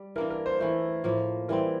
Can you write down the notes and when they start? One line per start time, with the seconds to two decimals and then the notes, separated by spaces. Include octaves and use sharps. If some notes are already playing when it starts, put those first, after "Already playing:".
Already playing: G3
0.16 E3 A#3 D4 A#4
0.30 A#4
0.46 C5
0.60 E3 A3 E4 C5
1.04 A2 F3 A#3 A#4
1.48 E3 G3 C4 A#4